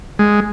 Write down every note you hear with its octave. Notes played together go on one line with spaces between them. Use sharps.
G#3